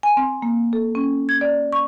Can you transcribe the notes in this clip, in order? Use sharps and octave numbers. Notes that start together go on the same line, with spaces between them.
G#5
C4
A#3
A4
C#4
G#6
D5
C#6